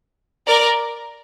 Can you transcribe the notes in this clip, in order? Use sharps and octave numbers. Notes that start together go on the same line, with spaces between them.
A#4 D5